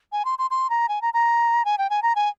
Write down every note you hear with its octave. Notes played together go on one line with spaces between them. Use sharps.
G#5
C6
C6
C6
A#5
G#5
A#5
A#5
G#5
G5
G#5
A#5
G#5